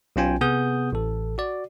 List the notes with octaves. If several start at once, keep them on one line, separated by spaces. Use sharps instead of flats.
B1 B2 C#4 F4 G5 G#5
C3 B3 G#4 F#5 D#6 G6
A1 A4
F#4 D5